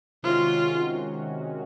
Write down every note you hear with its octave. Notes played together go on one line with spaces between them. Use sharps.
C3 D#3 G#3 C#4 F4 F#4